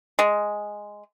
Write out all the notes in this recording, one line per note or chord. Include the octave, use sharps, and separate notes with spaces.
G#3